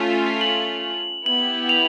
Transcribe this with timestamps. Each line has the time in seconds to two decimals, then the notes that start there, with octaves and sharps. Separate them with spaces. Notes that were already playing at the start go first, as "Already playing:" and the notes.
Already playing: A3 C#4 F4 F7
0.41 F#7
1.26 B3 E4 G4 F#7
1.69 F7